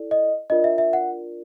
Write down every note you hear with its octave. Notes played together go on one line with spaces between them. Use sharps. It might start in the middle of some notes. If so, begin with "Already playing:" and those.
Already playing: E4 A4 D5
D#5
D4 F4 A#4 D5 D#5
E5
E5
F#5